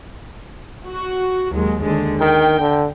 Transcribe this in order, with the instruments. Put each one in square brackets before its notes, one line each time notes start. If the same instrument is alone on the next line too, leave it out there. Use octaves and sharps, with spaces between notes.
[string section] F#4
D#2 F#3 G#3
D#2 D3 G#3
[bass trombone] D#3 [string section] G5
[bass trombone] D3